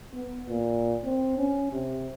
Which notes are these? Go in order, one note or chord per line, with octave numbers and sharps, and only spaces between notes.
B3
A#2
C4
C#4
C3